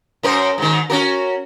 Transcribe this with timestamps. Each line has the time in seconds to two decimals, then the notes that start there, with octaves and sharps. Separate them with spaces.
0.23 F#2 A#4 C5
0.58 G#2 D#3
0.90 C#4 F#4 A#4